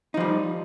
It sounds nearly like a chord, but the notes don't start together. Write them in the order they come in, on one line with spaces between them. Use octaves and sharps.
D#4 F3 G3